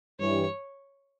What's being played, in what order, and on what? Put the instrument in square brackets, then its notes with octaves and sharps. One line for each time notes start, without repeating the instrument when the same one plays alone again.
[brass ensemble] G2 E3 G3 [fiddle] C#5